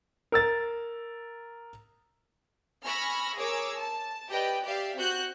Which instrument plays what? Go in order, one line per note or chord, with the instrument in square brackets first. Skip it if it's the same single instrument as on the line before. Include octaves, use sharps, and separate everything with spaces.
[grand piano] A#4 E6 A6
[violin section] G#5 B5 C#6 E6 F6 A#6
G#4 A#4 C#5 D6 E6
A5
G4 B4 D5 D#5 G5
G4 D5 E5 F5
C4 F#4 F#6 G6